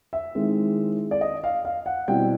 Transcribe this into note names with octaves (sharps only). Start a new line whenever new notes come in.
E5
D#3 G#3 C4 E4
D5
D#5
F5
F5
F#5
B2 G3 C4 E4 G5